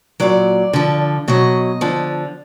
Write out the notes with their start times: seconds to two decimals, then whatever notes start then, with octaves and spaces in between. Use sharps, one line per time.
0.20 A#2 F#3 D5
0.73 D3 F3
1.28 B2 F#3 D#5
1.81 D3 F3